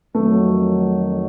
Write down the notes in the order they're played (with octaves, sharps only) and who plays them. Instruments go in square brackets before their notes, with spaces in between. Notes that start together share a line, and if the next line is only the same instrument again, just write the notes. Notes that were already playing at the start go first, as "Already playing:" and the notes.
[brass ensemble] F2 D#3 F#3 [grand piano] A3